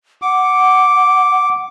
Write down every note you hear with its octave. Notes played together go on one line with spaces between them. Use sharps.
F#5 D6